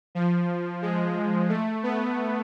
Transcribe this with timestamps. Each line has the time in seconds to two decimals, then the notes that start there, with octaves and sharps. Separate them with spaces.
0.15 F3
0.82 G#3
1.49 A3
1.83 B3